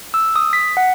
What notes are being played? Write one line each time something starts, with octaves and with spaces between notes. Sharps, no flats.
E6
D#6
B6
F#5